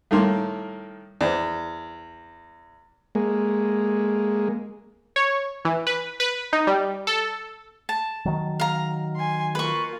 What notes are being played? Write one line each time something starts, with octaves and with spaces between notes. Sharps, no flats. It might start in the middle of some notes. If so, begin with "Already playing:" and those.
A2 D#3 G3 A#3 C6
E2 C5 D5
G#3 A#3
C#5
E3
B4
B4
D#4
G3
A4
A5
D#3 F#3
F5 A#5
G#5 C6
A#3 F4 B4 C#6